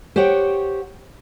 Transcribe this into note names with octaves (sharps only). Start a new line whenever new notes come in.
G4 C5 C#5 F#5 G5